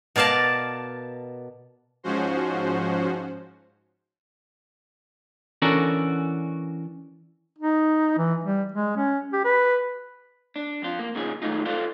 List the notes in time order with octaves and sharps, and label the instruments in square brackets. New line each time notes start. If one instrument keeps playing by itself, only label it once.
[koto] B2 A#4 D5 F5 A5
[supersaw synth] G#2 F3 C#4 F#4 C5
[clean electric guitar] E3 C#4 D4 F#4 A4 A#4
[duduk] D#4
E3
G3
G#3
C#4
G4
B4
[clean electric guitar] D4
F2 F4
A#3
A#2 C#3 F3 D#4 G#4
D#3 F#3 G#3 A3 D#4 F4
F4 A4 C5 D5 F5